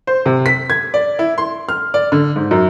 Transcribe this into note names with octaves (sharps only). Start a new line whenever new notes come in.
C5
C3
B6
G#6
D5
E4
C6
F6
D5
D3
G#2
F#2